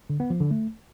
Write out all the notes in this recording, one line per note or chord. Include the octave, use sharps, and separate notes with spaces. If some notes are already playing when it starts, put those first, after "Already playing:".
D3
B3
F3
D3
A3